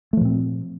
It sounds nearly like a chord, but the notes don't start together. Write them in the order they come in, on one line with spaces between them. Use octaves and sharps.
A3 F3 A#2 C4